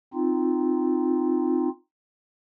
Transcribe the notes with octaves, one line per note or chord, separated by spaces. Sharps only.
C4 D#4 F4